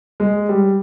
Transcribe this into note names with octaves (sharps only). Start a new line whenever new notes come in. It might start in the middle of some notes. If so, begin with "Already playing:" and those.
G#3
G3